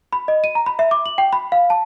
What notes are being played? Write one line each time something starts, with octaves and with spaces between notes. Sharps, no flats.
B5
D#5
D#7
A#5
B5
E5
D6
F#7
G5
B5
F5
A5